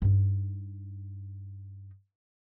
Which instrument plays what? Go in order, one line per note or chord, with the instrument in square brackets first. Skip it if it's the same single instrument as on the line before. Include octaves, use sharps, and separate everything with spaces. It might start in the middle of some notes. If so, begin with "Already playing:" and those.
[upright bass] G2 D#4